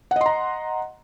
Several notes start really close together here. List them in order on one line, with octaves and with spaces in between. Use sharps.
F#5 D#5 C6 A#5